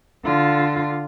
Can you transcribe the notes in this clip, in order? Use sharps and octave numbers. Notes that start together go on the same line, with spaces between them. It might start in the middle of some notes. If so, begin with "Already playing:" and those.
D3 F4